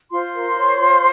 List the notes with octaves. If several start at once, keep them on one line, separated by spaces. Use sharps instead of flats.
F4 C5 C6
A#4
C#5
F4